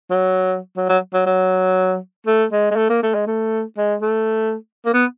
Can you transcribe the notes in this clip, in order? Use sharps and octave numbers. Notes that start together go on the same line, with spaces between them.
F#3
F#3
F#3
F#3
F#3
A3
G#3
G#3
A3
A#3
A3
G#3
A3
G#3
A3
A#3
B3